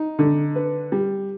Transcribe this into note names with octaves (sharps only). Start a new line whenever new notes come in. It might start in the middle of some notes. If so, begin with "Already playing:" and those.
Already playing: D#4
D3
B4
G3